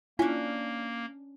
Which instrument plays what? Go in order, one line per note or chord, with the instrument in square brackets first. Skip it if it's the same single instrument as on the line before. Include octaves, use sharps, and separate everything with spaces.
[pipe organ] A#3 [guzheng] C#4 D4 [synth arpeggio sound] E4 F4 G#5